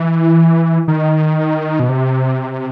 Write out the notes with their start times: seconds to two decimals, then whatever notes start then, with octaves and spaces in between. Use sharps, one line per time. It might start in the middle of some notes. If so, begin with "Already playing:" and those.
Already playing: E3
0.88 D#3
1.80 B2
1.89 C3